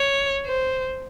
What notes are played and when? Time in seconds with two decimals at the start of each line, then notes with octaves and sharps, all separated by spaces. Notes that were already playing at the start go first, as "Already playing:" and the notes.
Already playing: C#5
0.46 C5